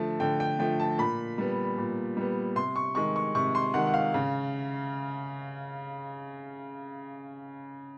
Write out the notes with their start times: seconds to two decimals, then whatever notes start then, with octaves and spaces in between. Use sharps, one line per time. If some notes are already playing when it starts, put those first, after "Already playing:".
Already playing: D3 F3 A3 A5
0.20 D3 G5
0.40 G5
0.59 F3 A3 G5
0.79 A5
0.98 A#2 B5
1.38 G3 B3
1.78 A#2
2.17 G3 B3
2.56 C3 C6
2.76 C#6
2.95 D#3 G#3 C#6
3.16 C#6
3.35 C3 C#6
3.55 C6
3.74 D#3 G#3 F#5
3.87 F#5
3.94 F5
4.14 C#3